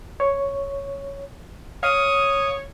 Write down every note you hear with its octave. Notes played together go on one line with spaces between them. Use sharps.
C#5
C#5 F5 D#6